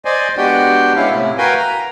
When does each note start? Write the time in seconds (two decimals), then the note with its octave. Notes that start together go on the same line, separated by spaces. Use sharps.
0.05 C5 D5 D#5 G#5
0.37 G#3 B3 D4 F#4 G4 G5
0.96 G#3 B3 C#4 E4 F5
1.10 A2 C3 E4
1.38 F#4 A#4 B4 F5 G5 G#5
1.57 A#5